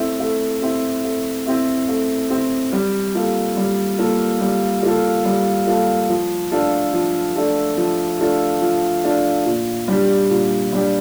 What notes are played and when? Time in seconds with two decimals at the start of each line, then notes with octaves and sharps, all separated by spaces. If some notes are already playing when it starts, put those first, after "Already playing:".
Already playing: A3 C4 E4
0.20 A3
0.62 C4 E4
1.04 A3
1.46 C4 E4
1.88 A3
2.30 C4 E4
2.72 G3
3.15 A#3 F4 A4
3.57 G3
3.99 A#3 F4 A4
4.41 G3
4.83 A#3 F4 A4
5.25 G3
5.67 A#3 F4 A4
6.09 F3
6.52 A3 D4 F4 A4
6.94 F3
7.36 A3 D4 F4 A4
7.77 F3
8.19 A3 D4 F4 A4
8.61 F3
9.04 A3 D4 F4 A4
9.46 A#2
9.88 G3 D4 G4
10.30 A#2
10.72 G3 D4 G4